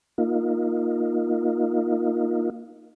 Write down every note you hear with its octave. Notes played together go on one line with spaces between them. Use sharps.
A#3 D#4 F4